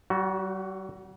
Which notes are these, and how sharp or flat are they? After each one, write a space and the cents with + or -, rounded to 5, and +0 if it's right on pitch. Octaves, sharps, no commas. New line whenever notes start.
G3 -45 F#4 +0